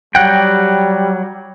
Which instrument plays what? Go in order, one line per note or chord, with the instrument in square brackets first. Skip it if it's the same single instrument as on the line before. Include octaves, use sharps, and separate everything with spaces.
[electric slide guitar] F#3 F#5 G5 [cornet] G3